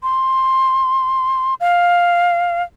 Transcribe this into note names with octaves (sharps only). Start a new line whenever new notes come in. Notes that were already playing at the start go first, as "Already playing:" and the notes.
C6
F5